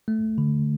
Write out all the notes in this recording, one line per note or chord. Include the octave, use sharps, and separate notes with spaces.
A3
D3